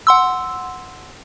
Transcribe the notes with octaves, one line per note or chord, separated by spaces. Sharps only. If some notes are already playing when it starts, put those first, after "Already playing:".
F#5 C6 E6